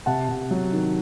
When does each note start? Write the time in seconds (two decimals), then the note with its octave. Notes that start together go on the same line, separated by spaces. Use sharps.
0.06 C3 F#5 A5
0.29 C3
0.51 F#3
0.73 D#3